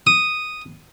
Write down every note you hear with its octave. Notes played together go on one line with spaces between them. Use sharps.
D#6